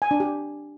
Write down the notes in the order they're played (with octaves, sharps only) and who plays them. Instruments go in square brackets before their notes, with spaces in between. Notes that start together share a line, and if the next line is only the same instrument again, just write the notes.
[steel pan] G#5
D4
G4